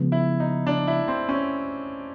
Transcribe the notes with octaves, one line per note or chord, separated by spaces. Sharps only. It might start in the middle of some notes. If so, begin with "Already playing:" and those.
Already playing: C#3 F3 G#3 B3
E4
D#4
D4
E4
C4
C#4